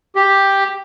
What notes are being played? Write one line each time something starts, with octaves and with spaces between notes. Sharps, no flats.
G4